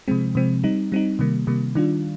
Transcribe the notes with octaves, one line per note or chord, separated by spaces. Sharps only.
C3 F3 G#3 C4
C3 F3 G#3 C4
G3 C4 D#4
G3 C4 D#4
C3 D#3 G3 A#3
C3 D#3 G3 A#3
D#3 G3 D4 F4